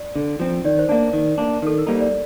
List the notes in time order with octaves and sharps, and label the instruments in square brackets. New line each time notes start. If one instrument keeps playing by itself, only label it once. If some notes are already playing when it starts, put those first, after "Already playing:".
Already playing: [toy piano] D5
[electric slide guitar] D3
F3 C4
[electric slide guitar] D#3 [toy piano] D5
[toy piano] C5
[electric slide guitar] A#3 D4 [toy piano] D5
[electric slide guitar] D#3
A#3 D4
[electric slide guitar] D#3 [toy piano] A4
[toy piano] A#4
[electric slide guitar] G3 A#3 D#4 [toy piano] C5
[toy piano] D5